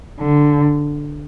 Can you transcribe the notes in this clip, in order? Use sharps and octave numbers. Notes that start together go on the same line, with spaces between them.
D3